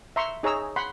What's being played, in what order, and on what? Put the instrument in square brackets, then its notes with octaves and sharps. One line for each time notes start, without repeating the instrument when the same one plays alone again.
[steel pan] E5 A#5 C6 C#6
D#4 G#4 C#5 A#5 E6
F#5 B5 C6